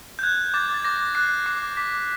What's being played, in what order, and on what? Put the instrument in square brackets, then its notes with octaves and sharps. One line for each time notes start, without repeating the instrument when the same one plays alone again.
[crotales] G6
F#6 G#6
D6 A6
A6
D6 A#6
F#6 C7
D6 C7
D6 B6